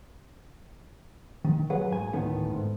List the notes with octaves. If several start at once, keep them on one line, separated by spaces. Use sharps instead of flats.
D#3
F#3 G#4 B4 F#5
G#2 G#5
D2 A2 D#3 A3 B3
G#2